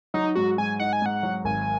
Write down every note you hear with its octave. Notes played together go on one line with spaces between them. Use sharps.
F#3 D#4
G#2 F#4
G#2 G#5
D#4 F#5
G#5
G#2 F#5
F#3
G#1 G#5